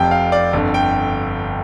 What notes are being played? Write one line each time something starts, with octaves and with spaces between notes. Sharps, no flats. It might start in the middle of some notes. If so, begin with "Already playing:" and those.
Already playing: F1 F2 C3 F3 G5
F5
D5
G1 F2 D3
G5